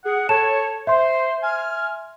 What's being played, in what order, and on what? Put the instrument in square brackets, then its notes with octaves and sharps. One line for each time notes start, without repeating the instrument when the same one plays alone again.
[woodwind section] G#4 F#5
[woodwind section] A4 C#5 [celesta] A5 E7
[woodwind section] C5 [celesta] E5 C6
[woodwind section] G#5 F6